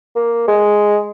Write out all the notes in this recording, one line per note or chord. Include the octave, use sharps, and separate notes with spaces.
A#3
G#3